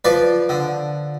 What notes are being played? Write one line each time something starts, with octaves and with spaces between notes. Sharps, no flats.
F3 B4 D5
D3